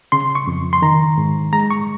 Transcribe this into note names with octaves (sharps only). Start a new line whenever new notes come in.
C#3 C6
C#6
F2
C6
D#3 A#5
G#2
G#3 A#5
C#6